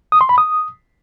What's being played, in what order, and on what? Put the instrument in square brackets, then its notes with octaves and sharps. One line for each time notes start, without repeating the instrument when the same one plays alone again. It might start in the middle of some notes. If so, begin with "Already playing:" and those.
[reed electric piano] D#6
C6
B5
D#6